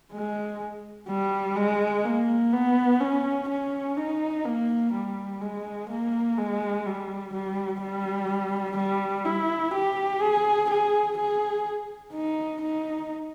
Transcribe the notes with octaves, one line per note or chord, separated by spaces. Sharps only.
G#3
G3
G#3
A#3
B3
C#4
C#4
D#4
A#3
G3
G#3
A#3
G#3
G3
G3
G3
G3
E4
G4
G#4
G#4
G#4
D#4
D#4